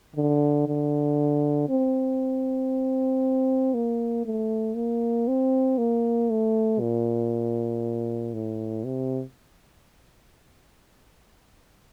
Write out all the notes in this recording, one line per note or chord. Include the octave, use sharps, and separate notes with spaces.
D3
D3
C4
A#3
A3
A#3
C4
A#3
A3
A#2
A2
C3